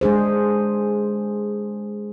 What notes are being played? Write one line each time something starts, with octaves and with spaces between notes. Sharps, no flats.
G#3 D4 G#4 C5